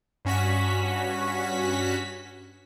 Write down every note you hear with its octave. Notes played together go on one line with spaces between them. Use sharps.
G2 C#4 F#4 B6